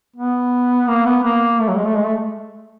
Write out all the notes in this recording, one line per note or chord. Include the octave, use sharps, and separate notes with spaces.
B3
A#3
B3
A#3
A3
F#3
G#3
A3
G#3
A3